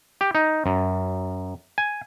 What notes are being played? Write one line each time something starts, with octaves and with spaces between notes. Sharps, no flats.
G4
D#4
F#2
G#5